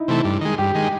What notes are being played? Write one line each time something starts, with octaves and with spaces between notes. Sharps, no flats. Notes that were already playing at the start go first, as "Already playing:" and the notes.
Already playing: D#4 E4
C3 E3 A3
G2
D#3 G#3
G2 G4
D#3 G#3